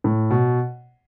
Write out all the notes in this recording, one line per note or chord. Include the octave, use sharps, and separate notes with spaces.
A2
B2